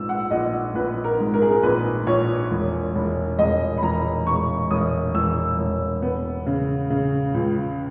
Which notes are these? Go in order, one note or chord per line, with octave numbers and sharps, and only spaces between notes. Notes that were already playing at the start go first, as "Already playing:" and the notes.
Already playing: A#1 G#2 E6
F#5
A#1 D#5
A#1 B4
A#4
G#2
A#4
G#4
A#4
A#1 B4
A#1 C#5
E1
E1
E1 D#5
B5
E1 A#5
E1 C#6
E1 D#6
E1 E6
E1
B3
C#3
C#3
C#2